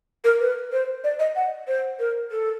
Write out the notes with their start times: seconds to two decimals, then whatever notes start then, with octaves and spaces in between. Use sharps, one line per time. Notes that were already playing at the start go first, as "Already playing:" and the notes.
0.24 A#4
0.40 B4
0.72 C5
1.04 D5
1.19 D#5
1.36 F#5
1.68 C5
1.99 A#4
2.31 A4